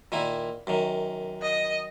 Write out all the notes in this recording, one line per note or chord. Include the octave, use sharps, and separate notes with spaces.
A#2 D#3 E4
F#2 D#3
D#5